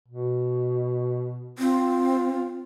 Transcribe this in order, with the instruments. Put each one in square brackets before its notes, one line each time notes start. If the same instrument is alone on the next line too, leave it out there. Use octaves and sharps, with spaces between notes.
[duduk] B2
[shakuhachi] C4 [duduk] F4